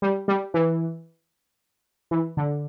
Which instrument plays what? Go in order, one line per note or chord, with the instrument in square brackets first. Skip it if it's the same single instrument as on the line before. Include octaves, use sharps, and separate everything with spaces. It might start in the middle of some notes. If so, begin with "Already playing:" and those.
[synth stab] G3
G3
E3
E3
D3